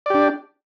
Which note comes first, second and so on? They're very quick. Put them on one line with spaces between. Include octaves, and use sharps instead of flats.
D5 G4 D4